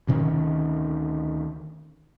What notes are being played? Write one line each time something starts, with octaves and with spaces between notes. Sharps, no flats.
D2 C3 D#3 C#4